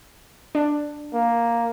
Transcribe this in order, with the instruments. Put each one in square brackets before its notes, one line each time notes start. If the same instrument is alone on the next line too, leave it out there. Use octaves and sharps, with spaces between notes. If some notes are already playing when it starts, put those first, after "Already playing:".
[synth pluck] D4
[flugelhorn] A#3